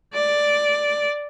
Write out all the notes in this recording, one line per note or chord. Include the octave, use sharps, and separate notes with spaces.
D5